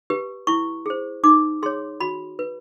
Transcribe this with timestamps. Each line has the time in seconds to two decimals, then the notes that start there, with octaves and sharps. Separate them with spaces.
0.10 G4 B4
0.47 E4 C#6
0.86 G#4 C5
1.24 D#4 D6
1.63 G#4 C#5 C6
2.00 F#4 B5
2.39 B4